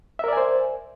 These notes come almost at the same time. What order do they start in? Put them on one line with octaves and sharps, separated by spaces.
E5 A#4 D5 G#5 C5